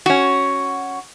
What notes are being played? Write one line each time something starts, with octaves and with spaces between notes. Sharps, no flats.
C#4 F#4